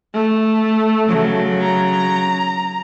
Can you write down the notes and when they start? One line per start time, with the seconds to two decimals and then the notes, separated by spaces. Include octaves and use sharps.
0.14 A3
1.05 C#3 F#3
1.61 A#5